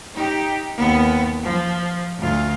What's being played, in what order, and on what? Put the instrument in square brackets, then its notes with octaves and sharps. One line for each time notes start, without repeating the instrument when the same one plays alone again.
[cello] D#4 G4
D#2 B3
F3
D2 F4